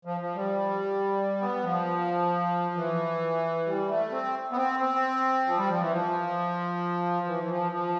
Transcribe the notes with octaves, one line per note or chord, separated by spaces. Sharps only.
F3
F3
G3
B3
F3
E3
G3
A3
C4
B3
C4
C4
F3
G3
F3
E3
F3
E3
E3
F3
F3